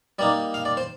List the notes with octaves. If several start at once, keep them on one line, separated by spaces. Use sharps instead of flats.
G3 A#3 D#4 D5
F5
D5
C5